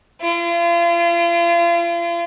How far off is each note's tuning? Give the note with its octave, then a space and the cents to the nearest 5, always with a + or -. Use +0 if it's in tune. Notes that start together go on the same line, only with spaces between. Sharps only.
F4 -35